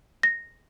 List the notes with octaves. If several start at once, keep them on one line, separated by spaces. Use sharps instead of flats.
A#6